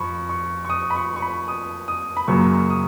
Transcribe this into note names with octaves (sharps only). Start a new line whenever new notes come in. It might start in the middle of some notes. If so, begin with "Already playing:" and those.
Already playing: F2 B5 C#6
C#6
C#6
D#6
B5
C#6
C#6
B5
D#6
D#6
B5
F#2 C#3 F#3 A#3 C#6
C#6
D#6